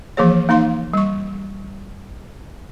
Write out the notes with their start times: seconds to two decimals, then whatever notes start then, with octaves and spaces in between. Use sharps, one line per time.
0.17 E3 F3 A#3 G#4 C#5
0.49 A#3 D#4 F5 C6
0.94 G3 C#6